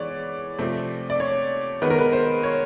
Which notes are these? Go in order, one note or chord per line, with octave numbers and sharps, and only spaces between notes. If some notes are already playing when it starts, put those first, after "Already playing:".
Already playing: E3 G#3 B3 C#5 D5
C3 F3 A3 C4
D5
C#5
D#3 G#3 B3 B4
A#4
B4
C5
C#5